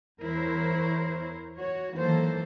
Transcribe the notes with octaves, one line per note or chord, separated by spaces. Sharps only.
E2 E4 A#4 C5 C#5
F#4 C#5
D#3 E3 F#3 A#3 A4 C5